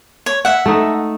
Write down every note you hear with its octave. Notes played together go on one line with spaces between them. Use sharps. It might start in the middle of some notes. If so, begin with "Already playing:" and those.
C#5
E5 F#5
A3 D#4